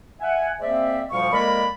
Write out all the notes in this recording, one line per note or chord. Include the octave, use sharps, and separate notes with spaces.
E5 F#5 G#5
G#3 A#3 C4 C5 D5 E5
D2 A#2 F3 G3 F5 C#6
F2 G#3 A#3 A#4 D5 B5